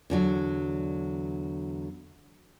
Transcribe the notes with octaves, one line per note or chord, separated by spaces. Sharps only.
E2 D3 F#3